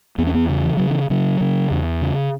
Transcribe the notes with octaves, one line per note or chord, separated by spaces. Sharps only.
E2 B3
C#4
B3
C#3
E3
C#3 F#3
E3
C#3 F#3
C#3
E2
C#3